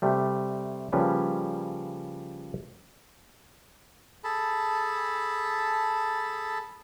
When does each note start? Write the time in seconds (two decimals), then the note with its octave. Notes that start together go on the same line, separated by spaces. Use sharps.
0.02 C3 G3 A3
0.92 C#3 F3 G3 A#3 C#4 B4
4.24 G#4 A4 A5 B5